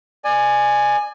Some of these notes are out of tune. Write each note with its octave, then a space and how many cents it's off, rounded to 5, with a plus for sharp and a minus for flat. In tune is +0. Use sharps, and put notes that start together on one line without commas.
D5 +30 G#5 +0